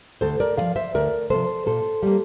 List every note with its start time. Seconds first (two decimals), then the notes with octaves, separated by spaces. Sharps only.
0.21 D2 A4 C5
0.40 A#4 D5
0.57 C3 F3 D5 F5
0.76 C5 E5
0.94 D2 A#4 D5
1.30 C3 F3 A4 C5
1.66 A#2 A4 C5
2.03 G3 A#3